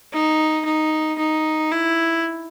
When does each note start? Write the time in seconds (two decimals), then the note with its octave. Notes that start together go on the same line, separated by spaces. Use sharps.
0.13 D#4
0.65 D#4
1.19 D#4
1.72 E4